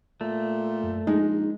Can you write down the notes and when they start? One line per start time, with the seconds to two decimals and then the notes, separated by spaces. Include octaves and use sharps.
0.21 A#2 A3
0.83 F#2
1.07 A#1 G#3 D#4